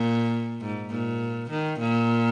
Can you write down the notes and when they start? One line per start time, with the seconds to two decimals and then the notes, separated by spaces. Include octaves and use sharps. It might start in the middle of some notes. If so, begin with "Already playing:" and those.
Already playing: A#2
0.61 G#2
0.91 A#2
1.50 D#3
1.79 A#2